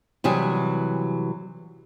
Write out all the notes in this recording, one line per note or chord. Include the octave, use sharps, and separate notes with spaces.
C3 E3 F#3 G3 G#4